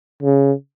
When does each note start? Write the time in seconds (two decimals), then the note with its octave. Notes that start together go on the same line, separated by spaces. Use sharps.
0.23 C#3